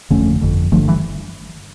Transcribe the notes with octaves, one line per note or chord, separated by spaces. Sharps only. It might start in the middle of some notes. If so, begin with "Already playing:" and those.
G1 F2 D3 A3 C#4
G1 F2 D3
G1 G2 D3 F3 A3
E3 G3